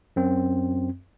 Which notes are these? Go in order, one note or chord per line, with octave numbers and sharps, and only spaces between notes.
F#2 C4